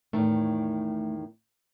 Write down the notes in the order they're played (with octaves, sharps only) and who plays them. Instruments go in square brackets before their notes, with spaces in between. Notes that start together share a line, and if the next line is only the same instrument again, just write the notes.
[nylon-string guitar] E2 A2 D#3 [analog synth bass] A3